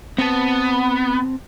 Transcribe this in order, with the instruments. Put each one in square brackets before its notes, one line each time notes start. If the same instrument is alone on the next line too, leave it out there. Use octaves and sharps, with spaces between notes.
[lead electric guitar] B3 [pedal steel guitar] C4 A5